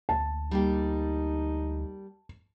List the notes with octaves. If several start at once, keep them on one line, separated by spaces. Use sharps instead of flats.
D2 A5
G3 A#3 D#4 G4